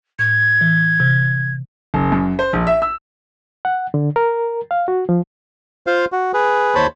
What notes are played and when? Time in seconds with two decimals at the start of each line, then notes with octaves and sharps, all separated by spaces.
0.19 A2 G#6
0.61 E3
1.00 C3
1.94 F#1
2.12 F#2
2.39 C5
2.53 A#1
2.67 E5
2.82 E6
3.65 F#5
3.94 D3
4.16 A#4
4.71 F5
4.88 F#4
5.09 F3
5.87 F4 C5 F5
6.12 F#4
6.34 G#4 B4
6.75 D#2 C5 C#5 A5 B5